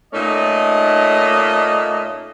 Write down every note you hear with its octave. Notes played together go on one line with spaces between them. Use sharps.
A#2 A3 C#4 D#4 D5 D#5